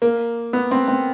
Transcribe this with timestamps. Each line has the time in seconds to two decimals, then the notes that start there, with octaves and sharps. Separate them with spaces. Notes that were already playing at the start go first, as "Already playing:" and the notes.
0.02 A#3
0.53 B3
0.71 C4
0.88 C4